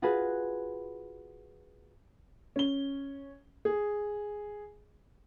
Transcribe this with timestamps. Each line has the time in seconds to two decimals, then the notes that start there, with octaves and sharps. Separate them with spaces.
0.02 F4 F#4 G#4 B4
2.56 C#4 G7
3.65 G#4